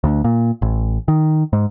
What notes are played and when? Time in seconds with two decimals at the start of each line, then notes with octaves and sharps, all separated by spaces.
0.04 D2
0.24 A#2
0.62 A1
1.08 D#3
1.53 G#2